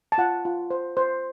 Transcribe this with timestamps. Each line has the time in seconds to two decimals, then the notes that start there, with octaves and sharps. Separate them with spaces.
0.12 A5
0.18 F4 F#5
0.45 F4
0.70 C5
0.97 C5